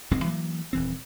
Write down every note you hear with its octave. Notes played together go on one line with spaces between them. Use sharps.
D1 B1 G#3 C4
E3 F#3 A#3
D#1 E3 C4